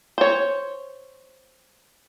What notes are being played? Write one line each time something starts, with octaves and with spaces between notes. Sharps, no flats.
C5 C#5